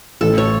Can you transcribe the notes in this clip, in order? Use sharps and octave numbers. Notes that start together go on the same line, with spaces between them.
A1 A4
C#5